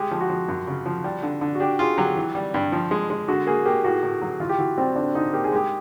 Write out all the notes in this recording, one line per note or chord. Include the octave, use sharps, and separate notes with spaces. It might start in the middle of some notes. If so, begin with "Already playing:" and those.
Already playing: G#3 G4
F3
F#4
F3
F#2
C#3
F3
G3
D3
D3
F#4
D4 G4
F4 G#4
F#3 G4
E3
G3
G2
F3
G#3
G#3
D3 F#4
A#3 G#4
A#3 G4
A2 F#4
A2
F#3
E3 F4
G4
E3 F#4
G3 C4
D3 D4
D3 D#4
A#3 G4
G#4
G#3 G4